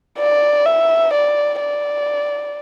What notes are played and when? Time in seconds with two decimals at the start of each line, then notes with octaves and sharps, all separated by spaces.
0.19 D5
0.66 E5
1.13 D5
1.60 D5